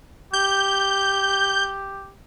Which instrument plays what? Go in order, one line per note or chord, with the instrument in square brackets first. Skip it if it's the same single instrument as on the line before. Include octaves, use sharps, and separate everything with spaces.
[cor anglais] G4 [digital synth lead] G6